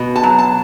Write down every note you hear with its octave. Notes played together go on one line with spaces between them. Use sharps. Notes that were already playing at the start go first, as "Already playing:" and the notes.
Already playing: B2
A5
F#3
A5